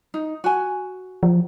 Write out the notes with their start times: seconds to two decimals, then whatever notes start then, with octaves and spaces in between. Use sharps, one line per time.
0.14 D#4
0.44 F#4 G#5
1.23 F3